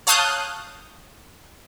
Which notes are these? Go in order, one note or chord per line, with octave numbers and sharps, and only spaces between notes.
C#5 F5 A5 D#6 F#6 G6